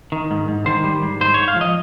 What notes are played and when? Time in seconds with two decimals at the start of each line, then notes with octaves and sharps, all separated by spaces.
0.12 D#3
0.31 G#2
0.48 G#2
0.66 D#3 C5
0.84 G3
1.02 G#2
1.21 G#2 C5
1.34 G#2 C#5
1.48 F5
1.56 F3 D#5